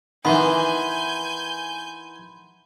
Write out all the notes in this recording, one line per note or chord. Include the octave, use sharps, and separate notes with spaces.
D#3 E3 B3 G#5 B5 C6 G6